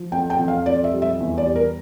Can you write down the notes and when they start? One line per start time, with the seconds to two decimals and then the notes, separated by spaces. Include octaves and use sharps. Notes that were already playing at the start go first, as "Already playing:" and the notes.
Already playing: F3
0.12 F2 G5
0.30 G5
0.39 F2
0.48 F5
0.66 F2 D5
0.84 E5
0.93 G3
1.02 E5
1.20 E2
1.38 D5
1.47 G3
1.56 A#4